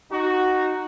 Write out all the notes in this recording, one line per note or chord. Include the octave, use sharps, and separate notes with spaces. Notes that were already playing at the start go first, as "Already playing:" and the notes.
D#4 F#4